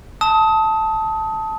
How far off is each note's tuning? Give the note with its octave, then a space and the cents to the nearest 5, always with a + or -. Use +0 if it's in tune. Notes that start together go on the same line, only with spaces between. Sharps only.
A5 +0 D#6 +30